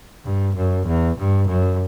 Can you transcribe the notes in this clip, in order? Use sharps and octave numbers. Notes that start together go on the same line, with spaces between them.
G2
F#2
E2
G2
F#2